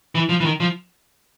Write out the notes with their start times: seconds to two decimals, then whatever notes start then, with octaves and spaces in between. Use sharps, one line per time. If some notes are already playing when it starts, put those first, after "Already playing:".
0.15 E3
0.29 F3
0.40 E3
0.45 D#3
0.60 F3